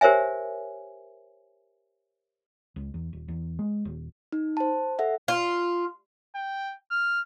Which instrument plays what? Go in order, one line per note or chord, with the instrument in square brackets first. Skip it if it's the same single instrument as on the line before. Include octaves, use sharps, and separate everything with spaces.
[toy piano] G4 A#4 C5 C#5 E5 G#5
[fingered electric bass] C#2
E2
D#1
E2
G#3
D#1
[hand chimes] D#4
C5 A5
A4 E5 F#5
[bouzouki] F4
[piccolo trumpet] G5
F6